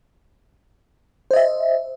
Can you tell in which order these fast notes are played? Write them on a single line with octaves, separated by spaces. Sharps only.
C5 D#5 E5